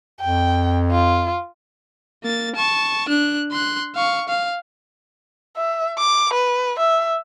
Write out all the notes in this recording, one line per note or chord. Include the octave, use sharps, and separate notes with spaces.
F2 G5
F4
A#3 A6
A5 C#6
D4 F#6
C6 F#6
F5 C#6
F5
E5
D6
B4
E5